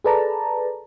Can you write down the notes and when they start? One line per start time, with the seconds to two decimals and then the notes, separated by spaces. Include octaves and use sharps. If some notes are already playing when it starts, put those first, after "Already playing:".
0.04 G#4 A4 B4 D5 A5 A#5